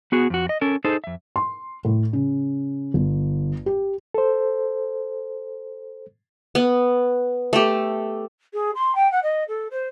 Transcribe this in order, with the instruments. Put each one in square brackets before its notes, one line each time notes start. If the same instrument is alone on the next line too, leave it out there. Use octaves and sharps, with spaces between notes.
[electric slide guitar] B3 F#4 G#4
F2 F#4
D#5
C#4 A4 A#4
D#4 G#4 A4 C5
F2 E5
[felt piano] C6
A2
C#3
G1
G4
[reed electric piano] A4 C5
[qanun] B3
A3 G4
[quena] G#4
C6
G5
F#5
D#5
A4
C5